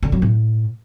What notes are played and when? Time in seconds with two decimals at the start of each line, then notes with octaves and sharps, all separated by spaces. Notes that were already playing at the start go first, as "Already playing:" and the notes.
0.03 D3
0.12 F#3
0.22 A2